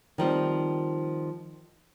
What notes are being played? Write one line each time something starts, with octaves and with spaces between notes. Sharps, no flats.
D#3 F3 G3 C4